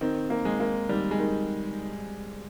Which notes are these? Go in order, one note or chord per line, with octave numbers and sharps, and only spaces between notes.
D#3 C4
A#3
G#3
A#3
D#3 G3
G#3
D#3